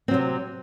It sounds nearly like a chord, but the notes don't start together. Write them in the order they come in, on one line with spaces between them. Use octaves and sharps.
C4 F#3 C3